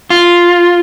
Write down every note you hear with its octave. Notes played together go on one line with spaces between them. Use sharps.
F4